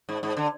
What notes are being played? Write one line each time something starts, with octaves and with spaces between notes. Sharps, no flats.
G#2
G#2
D3